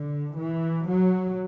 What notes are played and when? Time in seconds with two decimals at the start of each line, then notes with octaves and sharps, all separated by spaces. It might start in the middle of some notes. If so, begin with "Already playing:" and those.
Already playing: D3
0.37 E3
0.88 F#3